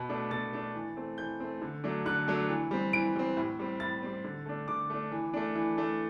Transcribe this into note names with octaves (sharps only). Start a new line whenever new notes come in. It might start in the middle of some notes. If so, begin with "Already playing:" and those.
Already playing: B2
A3 D4
B2 A6
A3 D4
E3
A3 C4
E3 G6
A3 C4
D3
F#3 A3 D4
D3 F#6
F#3 A3 D4
E3
G3 C4
E3 D7
G3 C4
A2
G3 C4
A2 A6
G3 C4
D3
A3 D4
D3 D6
A3 D4
E3
A3 D4
E3
A3 D4